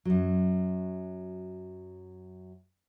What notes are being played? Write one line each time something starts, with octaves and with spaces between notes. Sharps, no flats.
F#2 F#3